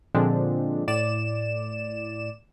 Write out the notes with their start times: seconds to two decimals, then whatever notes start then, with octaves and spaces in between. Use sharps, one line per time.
0.15 A#2 D3 F3 G#3 C4 D4
0.88 A2 D5 E7